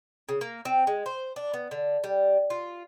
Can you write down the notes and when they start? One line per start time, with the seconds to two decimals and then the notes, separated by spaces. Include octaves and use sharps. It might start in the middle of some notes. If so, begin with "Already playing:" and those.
0.29 C#3
0.41 A#3
0.65 C4
0.87 G#3
1.06 C5
1.36 D4
1.54 B3
1.71 D3
2.04 G3
2.50 F4